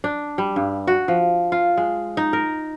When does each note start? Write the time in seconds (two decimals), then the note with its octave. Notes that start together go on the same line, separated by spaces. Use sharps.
0.04 D4
0.38 G3
0.56 G2
0.87 F#4
1.08 F3
1.52 F4
1.77 G#3
2.17 D#4
2.33 A#4